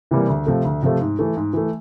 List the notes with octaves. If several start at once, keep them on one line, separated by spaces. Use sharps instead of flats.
C3 E3 G3 A#3
D2
C3 F3 A3
D2
C3 F3 A3
G#2
E3 A3
G#2
E3 A3